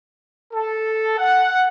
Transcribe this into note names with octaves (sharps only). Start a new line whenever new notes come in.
A4
F#5